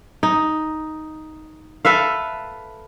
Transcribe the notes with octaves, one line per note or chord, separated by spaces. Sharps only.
D#4
A4 B4 E5 F5